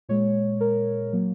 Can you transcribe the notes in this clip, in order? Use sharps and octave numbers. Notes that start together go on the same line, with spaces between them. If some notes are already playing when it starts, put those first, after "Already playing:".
A#2 G#3 C#5
A#4
F#3 A#3